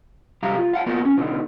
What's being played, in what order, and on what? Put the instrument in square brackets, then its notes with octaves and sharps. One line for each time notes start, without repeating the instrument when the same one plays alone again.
[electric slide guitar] C3 G3 G4 F5 A#5
F4
F5 F#5 A5
A#3 B3 F4 A#4 F#5
C#4
B2 D3 D#4